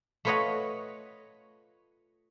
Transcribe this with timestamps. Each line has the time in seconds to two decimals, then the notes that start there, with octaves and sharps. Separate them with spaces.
0.25 A3 F4 B4 C#5 D#5 F#5